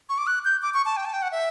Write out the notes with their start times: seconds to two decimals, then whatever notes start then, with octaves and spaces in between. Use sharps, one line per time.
0.09 C#6
0.18 D6
0.27 F#6
0.45 G6
0.62 D6
0.74 C#6
0.85 A5
0.97 G5
1.05 A5
1.13 G5
1.22 F#5
1.32 E5